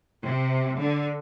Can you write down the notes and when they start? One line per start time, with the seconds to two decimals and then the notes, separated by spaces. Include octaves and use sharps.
0.24 C3
0.80 D3